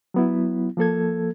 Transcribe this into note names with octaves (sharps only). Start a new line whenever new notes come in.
F#3 B3 E4
F3 A#3 A4 G#6